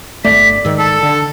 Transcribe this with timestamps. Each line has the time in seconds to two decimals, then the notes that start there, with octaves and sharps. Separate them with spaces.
0.25 G1 D#2 A3 D5 B6
0.65 G#2 D#3 E6
0.78 A4 A5
1.03 D3